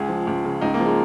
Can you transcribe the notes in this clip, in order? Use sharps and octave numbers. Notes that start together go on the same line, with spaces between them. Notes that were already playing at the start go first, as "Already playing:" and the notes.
Already playing: C#2 G#4
F3
C#2
C#3
C#2 D#4
A#3
F3
G#3